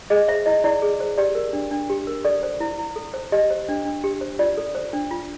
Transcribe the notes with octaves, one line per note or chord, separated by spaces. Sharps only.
G#4 D#5
C5 E5
E4 D#5
E4 D5
G#4
C5
G4 D5
A#4
D4
D4
G4
A#4
A4 D5
C5
E4
E4
A4
C5
G4 D#5
C5
D4
D4
G4
C5
F4 D5
A4
C5
D4
F4